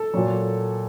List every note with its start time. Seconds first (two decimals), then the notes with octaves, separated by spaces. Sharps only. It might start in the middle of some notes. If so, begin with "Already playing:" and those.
Already playing: A4
0.14 A#2 F#3